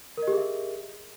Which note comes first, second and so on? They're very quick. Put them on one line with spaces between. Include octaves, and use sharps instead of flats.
A#4 D#5 G4 G#4 E5